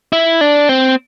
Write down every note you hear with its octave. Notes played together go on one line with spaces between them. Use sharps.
E4
D4
C4